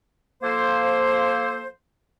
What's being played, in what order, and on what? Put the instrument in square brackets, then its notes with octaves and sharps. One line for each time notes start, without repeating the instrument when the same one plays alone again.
[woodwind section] F3 A#3 A4 C5